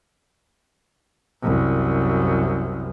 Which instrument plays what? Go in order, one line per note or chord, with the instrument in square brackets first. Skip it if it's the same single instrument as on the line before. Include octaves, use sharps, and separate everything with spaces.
[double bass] C2 F#2